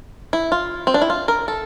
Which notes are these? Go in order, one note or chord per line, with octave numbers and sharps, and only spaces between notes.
E4
F4
C4
D4
E4
F4
A#4
A4